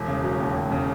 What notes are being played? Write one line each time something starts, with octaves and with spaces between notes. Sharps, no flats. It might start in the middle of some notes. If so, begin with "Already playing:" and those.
Already playing: E1
C#3
F#3
D#2
E1
C#3